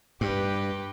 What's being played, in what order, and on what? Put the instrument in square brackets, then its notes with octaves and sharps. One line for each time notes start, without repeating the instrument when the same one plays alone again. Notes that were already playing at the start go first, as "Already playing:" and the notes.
[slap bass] G2 [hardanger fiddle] G4 B4